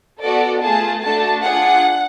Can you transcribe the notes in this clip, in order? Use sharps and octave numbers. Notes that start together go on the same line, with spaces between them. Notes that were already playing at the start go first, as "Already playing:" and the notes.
B3 F#4 A4 D5
A3 F4 G#4 A5
A3 D4 F#4 A4 A5
D4 F4 G#4 F#5